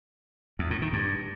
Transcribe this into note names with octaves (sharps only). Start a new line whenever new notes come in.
E2
A2
D#3
G2